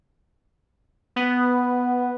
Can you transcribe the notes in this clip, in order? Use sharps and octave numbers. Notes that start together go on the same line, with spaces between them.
B3